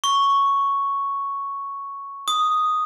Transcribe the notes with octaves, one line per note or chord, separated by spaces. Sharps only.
C#6
D#6